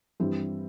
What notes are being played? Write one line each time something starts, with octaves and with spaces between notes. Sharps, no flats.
G2 E3 G3 C4 E4